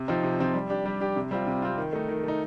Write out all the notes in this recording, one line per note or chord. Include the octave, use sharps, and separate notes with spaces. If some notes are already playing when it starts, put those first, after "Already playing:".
Already playing: C3
F3 C4 D#4
C3
F3 C4 D#4
G3
D4 G4
G3
D4 G4
C3
G3 C4 F4
C3
G3 C4 F4
D#3
A3 D#4
D#3
A3 D#4